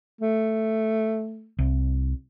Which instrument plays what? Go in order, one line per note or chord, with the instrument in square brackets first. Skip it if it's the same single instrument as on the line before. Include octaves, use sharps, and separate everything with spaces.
[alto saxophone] A3
[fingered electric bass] C2